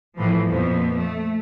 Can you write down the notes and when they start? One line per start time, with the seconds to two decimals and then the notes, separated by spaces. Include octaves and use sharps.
0.17 A2 E3 F3
0.46 F2 A#2 F3 B3
0.96 A3